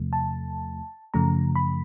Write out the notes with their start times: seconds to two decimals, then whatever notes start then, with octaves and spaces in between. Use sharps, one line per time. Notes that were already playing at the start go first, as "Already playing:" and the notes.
Already playing: E2 C3 F3 A3
0.13 A5
1.14 F#2 C#3 F3 A3 A#5
1.56 B5